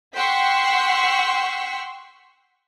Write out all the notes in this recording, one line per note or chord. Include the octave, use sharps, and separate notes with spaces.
F#5 G5 C6 C#6 E6 B6